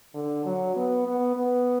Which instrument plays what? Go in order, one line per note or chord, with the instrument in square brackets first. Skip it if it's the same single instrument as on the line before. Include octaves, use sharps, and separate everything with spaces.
[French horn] D3
F#3
B3
B3
B3